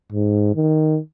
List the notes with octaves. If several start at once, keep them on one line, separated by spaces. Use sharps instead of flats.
G#2
D#3